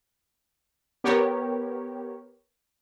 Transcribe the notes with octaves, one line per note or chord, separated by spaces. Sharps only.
B3 G4 A#4 C#5